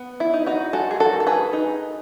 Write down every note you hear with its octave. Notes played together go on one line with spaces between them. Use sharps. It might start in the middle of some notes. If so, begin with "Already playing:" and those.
Already playing: B3
E4
D#4
D#4 F#4
G#3 F#4 A4
G#4
F#4 A4
D#3
A4
G#4 B4
D#4